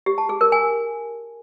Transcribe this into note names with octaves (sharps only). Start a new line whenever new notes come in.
G4
A5
G#4
A#4
G#5